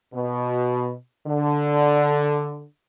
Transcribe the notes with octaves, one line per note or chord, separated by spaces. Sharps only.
B2
D3